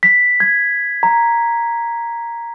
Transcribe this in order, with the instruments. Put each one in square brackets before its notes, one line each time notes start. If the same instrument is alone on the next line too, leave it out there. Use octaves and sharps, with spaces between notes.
[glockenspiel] B6
G#6
A#5